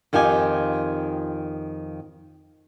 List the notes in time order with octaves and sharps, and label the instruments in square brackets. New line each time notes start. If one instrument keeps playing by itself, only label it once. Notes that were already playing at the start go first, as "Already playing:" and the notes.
[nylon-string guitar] F2 D#3 F4 G4 G#5